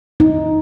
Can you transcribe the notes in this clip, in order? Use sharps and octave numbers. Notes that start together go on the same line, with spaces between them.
D#4